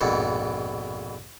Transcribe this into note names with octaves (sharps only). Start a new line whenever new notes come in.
A#1 F2 G#2 B2